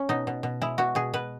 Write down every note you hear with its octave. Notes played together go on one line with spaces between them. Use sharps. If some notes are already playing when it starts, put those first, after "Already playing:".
Already playing: C#4
B2 D#4
B2
B2
G#3 E4
B2 F#4
B2 G#4
B2 B4